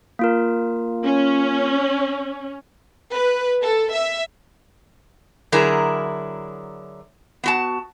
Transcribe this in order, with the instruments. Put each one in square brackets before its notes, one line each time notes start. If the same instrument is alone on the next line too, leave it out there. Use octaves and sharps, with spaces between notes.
[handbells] A#3 F4 A#4
[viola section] C#4
[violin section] B4
A4
E5
[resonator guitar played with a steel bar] D3 F#3 E4 G#4 A#4
B3 F#4 A5